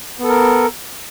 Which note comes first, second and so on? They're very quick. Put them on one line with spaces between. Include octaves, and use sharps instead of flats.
B3 A4 A#4